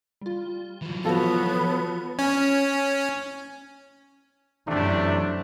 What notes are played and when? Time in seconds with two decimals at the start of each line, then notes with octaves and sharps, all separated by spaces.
0.21 G3 F4
0.82 E3 F#3
1.05 F3 B3 F4 F#4 A4 C#5
2.19 C#4
4.66 F#2 C3 E3 A3 D4